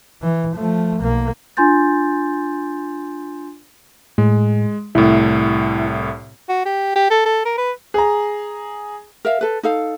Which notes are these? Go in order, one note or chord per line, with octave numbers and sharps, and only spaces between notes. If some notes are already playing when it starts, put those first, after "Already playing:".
E3
F3 A3
B1 A#3
D4 F4 G#5 C6 G6 A6
A2 G#3
C2 A2 E4
F#4
G4
G4
A4
A4
A#4
B4
G#4 A#5
A#4 E5 F5
A4 B4
D#4 A4 F5